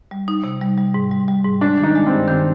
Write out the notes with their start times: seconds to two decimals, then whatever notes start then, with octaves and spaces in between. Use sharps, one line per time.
0.11 G3
0.28 D#4
0.44 C3
0.61 G3
0.78 G3
0.94 G#2
1.11 G3
1.28 G3
1.45 G#2
1.61 G#3 D4
1.78 D#3
1.83 D#4
1.95 G#3
2.06 C4
2.12 G2
2.28 D#3 C4